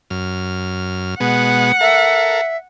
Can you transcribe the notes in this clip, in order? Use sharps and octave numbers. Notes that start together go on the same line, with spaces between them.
F#2 F6
B2 G#3 B3 F#5
A4 A#4 E5